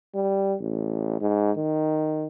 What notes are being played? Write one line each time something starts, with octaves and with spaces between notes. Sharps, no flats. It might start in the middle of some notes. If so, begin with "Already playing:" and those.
G3
A1
G#2
D#3